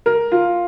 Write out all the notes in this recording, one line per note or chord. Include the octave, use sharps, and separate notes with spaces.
A#4
F4